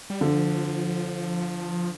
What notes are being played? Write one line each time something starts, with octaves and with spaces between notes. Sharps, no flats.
G3
D3 F3